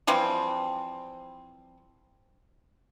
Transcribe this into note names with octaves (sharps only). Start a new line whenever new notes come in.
E3 F3 G3 C4